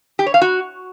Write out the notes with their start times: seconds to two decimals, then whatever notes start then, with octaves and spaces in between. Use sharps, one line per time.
0.19 G4
0.26 C#5
0.34 F5
0.42 F#4